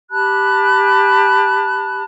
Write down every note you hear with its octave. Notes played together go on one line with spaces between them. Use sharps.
G4 A5 B5 F#6